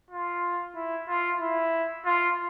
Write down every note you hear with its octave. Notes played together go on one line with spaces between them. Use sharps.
F4
E4
F4
E4
F4